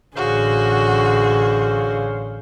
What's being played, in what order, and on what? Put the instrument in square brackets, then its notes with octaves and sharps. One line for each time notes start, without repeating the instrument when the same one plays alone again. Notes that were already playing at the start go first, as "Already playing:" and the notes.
[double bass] A1 D3 [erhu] F#4 [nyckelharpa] G#4 [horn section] C5 C#5 F5